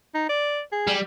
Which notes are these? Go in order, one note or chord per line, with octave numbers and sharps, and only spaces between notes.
D#4
D5
G#4
G3